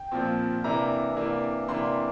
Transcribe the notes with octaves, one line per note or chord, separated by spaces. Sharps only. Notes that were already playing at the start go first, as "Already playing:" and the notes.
Already playing: G5
A#2 F3 C4
C3 E3 A#3 D4 A#5
C3 E3 A#3 D4
C3 E3 A#3 D4 C6